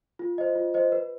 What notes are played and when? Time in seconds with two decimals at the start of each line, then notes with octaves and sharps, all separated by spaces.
0.19 F4
0.38 C5 D#5
0.56 F4
0.74 C5 D#5
0.92 B4